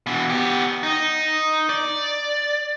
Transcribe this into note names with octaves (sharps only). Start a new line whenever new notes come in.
B2 E3
B3 G4
D#4
D5